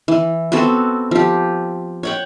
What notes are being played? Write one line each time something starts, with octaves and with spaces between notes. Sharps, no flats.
E3
B3 C4 F#4 A4
F3 G4
C#5 F#5 G5